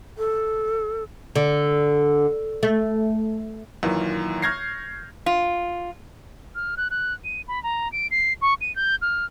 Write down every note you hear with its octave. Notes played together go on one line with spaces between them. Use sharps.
A4
D3
A3
F#2 A#2 D#3 E3
C#6 F6 G6 G#6 A#6 C7
F4
F6
F#6
F#6
D#7
B5
A#5
D7
C7
C#6
D#7
G6
F6